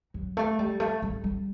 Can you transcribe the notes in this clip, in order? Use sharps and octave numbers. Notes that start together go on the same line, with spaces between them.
F#3
A3
G3
A3
G3
G3